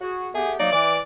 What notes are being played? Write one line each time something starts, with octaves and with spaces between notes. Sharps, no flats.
F#4 G#4
A3 B3 G4 G#4
F#3 A#3 D#4 D5
E3 D6